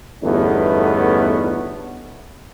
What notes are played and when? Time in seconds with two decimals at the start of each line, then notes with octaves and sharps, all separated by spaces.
0.23 G1 E2 A3 B3 C#4 D#4